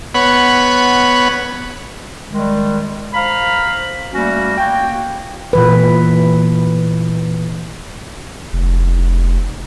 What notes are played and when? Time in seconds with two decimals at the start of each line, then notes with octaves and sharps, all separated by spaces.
0.14 B3 C#5 F#5 B5
2.31 D#3 G3 G#3
3.14 C5 F5 A#5 B5
4.12 G3 A3 A#3 C#4 F#4
4.58 A#3 F#4 G5
5.53 A#2 E3 B4
8.53 F1